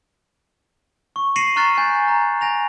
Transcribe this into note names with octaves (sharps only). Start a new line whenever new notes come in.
C#6
A#6 C7 C#7 D#7 E7 F#7
A#5 C#6 F6 F#6 A6 B6
G#5 G6 A6
G#5 A#5 F#6
G#5 A#6 F7